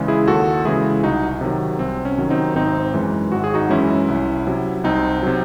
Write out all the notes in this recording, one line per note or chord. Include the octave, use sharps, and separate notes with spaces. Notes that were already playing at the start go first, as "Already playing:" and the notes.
Already playing: C#3 E3 G#3
E4 G#4
D#2 F#4 A4
C#3 E3 G#3 E4 G#4
C2 D#4 F#4
C3 D#3 F#3
C2 C4
C#4
C3 D#3 F#3
C4 D#4
G#1 C4 D#4
F#2 E3 G#3
G#1 F#4
G#4
D#4 F#4
F#2 E3 G#3 C#4 E4
C2
C3 F#3
C2 C4 D#4
C3 F#3